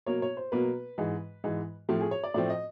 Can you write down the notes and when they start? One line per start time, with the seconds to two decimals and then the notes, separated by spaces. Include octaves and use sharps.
0.06 B2 F#3 A#3 C#5
0.22 C#5
0.37 C5
0.52 B2 F#3 A#3 B4
0.98 G#2 E3 G#3
1.44 G#2 E3 G#3
1.89 A2 F3 A3 C4 G4
2.01 G#4
2.11 C#5
2.24 D5
2.34 A2 F3 A3 C4 D5
2.50 D#5